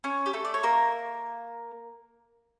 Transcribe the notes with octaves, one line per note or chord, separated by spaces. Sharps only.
C#4 C#5
G4
A3 A4
D5
C#5
A#3 A#4